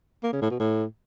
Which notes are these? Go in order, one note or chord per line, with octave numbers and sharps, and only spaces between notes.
A#3
C#3
A2
B2
A2